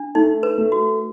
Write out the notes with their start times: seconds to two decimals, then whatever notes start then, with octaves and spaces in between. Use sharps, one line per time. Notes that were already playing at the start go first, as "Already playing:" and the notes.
Already playing: D4
0.15 A3 D#4
0.43 B4
0.58 A3
0.72 F#4